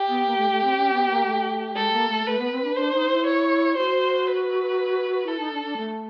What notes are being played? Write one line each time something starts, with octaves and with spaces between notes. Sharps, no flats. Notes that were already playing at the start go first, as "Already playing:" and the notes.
Already playing: G4
B3
A#3
A3
A3
C4
C#4
B3
A#3
A3
G#3 A4
A#3
A3
A3 B4
B3
C4
D4
D4 C5
D#4
E4
C#5
F#4 C5
B4
E4 A4
D#4
D4
D4
A3